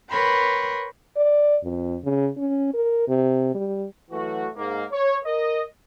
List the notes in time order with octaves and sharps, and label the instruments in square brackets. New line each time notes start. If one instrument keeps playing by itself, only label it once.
[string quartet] A#4 B4 C#5 G5 B5 C6
[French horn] D5
F2
C#3
C#4
A#4
C3
G3
[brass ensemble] E3 F#3 A3 F#4
G#2 A#3
C#5
A#4 D#5